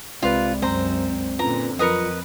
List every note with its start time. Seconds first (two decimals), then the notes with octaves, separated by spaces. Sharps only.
0.22 C2 C3 G#3 F4 B4 D5
0.62 F#2 C4 C5 A#5
1.39 A#2 D3 C#4 F4 B4 A#5
1.79 F2 F#3 F4 A#4 B4 D#5 C#7